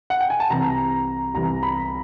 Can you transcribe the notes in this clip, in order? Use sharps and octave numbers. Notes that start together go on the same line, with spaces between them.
F#5
G5
G#5
A5
C2 C3 E3 A#5
C2 C3 E3 A#5
B5